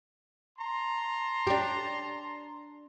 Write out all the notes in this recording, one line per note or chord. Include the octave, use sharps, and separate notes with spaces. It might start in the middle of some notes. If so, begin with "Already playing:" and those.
A5 A#5 C6
D4 G4